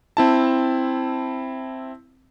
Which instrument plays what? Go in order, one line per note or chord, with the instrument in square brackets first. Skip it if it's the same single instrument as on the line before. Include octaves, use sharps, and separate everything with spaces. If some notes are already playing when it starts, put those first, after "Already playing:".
[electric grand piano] C4 E4 A5